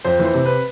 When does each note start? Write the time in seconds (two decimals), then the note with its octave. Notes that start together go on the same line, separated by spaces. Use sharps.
0.04 F2 C5
0.19 E3
0.25 C5
0.34 C3
0.45 B4